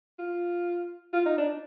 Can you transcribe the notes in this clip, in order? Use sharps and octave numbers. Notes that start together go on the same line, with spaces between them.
F4
F4
D#4
D4